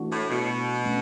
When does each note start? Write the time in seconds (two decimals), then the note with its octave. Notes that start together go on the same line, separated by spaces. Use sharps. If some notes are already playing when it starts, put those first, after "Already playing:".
Already playing: E3 A3 D4 F#4
0.12 A2
0.30 B2
0.86 A3 C#4